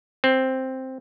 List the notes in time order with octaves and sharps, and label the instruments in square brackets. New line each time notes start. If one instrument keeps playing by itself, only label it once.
[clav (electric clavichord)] C4